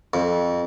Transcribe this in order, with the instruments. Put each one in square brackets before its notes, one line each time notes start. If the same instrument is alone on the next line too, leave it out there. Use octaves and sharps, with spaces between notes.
[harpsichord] F2